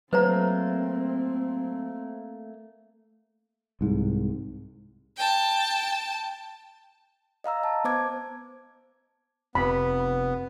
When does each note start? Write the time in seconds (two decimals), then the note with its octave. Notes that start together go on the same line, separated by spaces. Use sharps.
0.13 F#3 A3 A#3 C4 B4 C5 A#5
3.81 C2 G#2
5.17 G5 A5
7.44 D#5 F5 A#5 E6
7.63 A5
7.84 B3 C5 D6 G#6
9.55 F1 C3 B3 B5